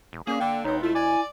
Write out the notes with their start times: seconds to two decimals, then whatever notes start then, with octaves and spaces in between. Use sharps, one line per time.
0.13 E1
0.27 A#2 A#3 C#4 G#4
0.40 D3 G5
0.64 E1 B3 C4 D#4 C#5
0.82 A3 E4 F4
0.95 D5 G#5